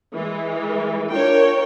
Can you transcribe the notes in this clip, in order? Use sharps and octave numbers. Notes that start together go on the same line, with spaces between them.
E3 G#3
D4 F4 A#4 C#5 G5